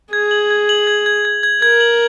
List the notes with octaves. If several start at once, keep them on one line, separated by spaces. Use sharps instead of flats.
G#4 G#6
F#7
G#6
F#7
G#6
G#6
G#6
G#6
A#4 G#6
F#7